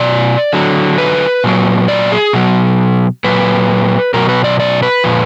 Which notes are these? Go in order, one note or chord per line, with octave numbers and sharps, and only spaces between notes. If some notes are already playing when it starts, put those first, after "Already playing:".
Already playing: B2 F#3 D5
D3 F#3
B4
A#2 F#3
D5
G#4
B2 F#3
A#2 F#3 B4
B2 F#3 A#4
B4
D5
D5
B4
A#2 F3